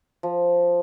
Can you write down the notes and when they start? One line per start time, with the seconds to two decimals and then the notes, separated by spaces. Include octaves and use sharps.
0.23 F3